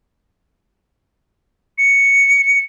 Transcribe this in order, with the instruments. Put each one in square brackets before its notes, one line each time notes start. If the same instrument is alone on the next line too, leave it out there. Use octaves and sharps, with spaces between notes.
[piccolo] C#7